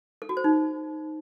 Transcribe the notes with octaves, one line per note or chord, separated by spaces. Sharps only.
A4
F#4
C5
D#4